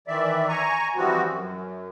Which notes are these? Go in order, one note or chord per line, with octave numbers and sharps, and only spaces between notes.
D#3 E3 D5 E5
G#5 A#5 C#6
E3 F3 G3 C4 F#4
F#2